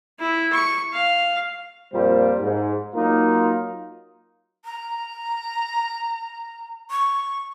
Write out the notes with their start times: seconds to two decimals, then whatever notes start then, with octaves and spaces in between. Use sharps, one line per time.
0.19 E4
0.52 C#6
0.93 F5
1.93 F2 A#2 G3 F4 A#4 C5
2.40 G#2
2.95 F#3 A#3 D#4 F4 A#4
4.64 A#5
6.90 C#6